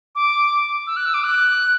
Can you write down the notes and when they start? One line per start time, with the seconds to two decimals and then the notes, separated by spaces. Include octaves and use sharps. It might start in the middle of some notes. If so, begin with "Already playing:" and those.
0.15 D6
0.87 E6
0.97 F#6
1.06 E6
1.14 D6
1.24 F#6